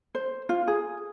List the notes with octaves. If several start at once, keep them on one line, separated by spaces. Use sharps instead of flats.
C5
F4
G#4